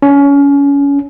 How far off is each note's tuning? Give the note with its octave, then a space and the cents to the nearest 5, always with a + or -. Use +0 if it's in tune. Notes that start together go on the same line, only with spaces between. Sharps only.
C#4 +25